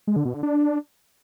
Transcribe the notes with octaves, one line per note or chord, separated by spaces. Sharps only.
G#3
D3
B2
D3
D4